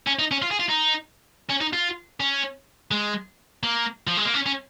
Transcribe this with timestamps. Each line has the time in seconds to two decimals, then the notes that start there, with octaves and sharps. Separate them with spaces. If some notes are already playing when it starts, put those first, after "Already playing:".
0.07 C#4
0.19 D#4
0.31 C#4
0.42 F4
0.51 G#4
0.60 F4
0.69 D#4
1.50 C#4
1.61 D#4
1.73 F4
2.20 C#4
2.91 G#3
3.63 A#3
4.07 F3
4.17 G#3
4.25 A#3
4.34 C#4
4.46 C#4